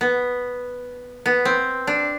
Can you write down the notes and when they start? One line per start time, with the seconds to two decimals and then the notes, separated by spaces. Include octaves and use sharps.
0.01 B3
1.26 B3
1.45 C4
1.87 D4